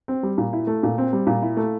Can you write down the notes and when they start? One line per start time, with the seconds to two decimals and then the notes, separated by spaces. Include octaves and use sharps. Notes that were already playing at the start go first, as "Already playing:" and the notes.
0.08 C4
0.23 G3
0.38 A#2
0.53 E4
0.67 A3
0.83 A#2
0.98 C4
1.13 G3
1.27 A#2
1.42 E4
1.57 A3